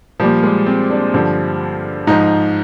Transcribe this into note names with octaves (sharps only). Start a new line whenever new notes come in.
A#2 F3 G3
G#3
C4
D4
G2 D3 F3
G#2 F3 D#4